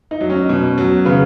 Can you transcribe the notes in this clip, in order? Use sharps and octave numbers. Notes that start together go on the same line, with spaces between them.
D#4
F#3
C#4
B2
F#3
C#3 B3